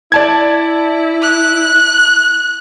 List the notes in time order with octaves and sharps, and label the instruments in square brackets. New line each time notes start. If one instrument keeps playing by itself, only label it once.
[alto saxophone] E4 [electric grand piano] D5 A5 G#6
[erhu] F#6